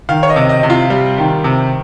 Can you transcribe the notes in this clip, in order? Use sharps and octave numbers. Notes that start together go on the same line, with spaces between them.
D#3 F5
C#5
D#5
C3
D#5
C3
F4
G3
D#3
C3